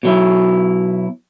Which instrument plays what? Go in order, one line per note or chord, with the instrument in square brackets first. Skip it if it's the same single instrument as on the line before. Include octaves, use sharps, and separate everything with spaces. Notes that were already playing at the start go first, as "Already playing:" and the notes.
[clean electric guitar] B2 F#3 E4